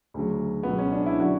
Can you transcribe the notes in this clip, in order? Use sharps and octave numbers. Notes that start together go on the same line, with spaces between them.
D2 C#3 F#3
C#2 B2 F#3 B3
C#4
D4
E4
D3 F#3 F#4